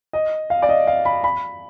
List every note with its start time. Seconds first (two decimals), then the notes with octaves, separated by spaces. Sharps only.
0.13 D#5
0.50 F5
0.62 D5
0.69 D#5
0.87 F5
1.05 B5
1.24 B5